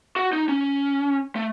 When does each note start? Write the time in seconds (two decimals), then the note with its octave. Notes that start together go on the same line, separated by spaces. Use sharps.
0.16 F#4
0.33 D#4
0.49 C#4
1.36 A3